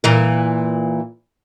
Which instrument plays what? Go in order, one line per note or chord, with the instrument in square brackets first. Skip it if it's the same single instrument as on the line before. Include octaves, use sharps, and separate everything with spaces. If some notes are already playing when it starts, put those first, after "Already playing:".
[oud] A#2 E3 A#4